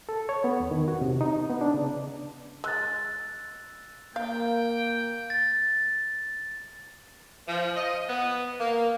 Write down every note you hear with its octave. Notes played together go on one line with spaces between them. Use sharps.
A4
C#5
B3
E2
D#3
F#4
C3
D#4
B3
D4
C#3
G#3 E6 F#6 A6
A#3 F5 G5
A6
F3
D#5
B3
A#3